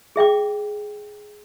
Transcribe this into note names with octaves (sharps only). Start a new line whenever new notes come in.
G#4 E5 G5 D6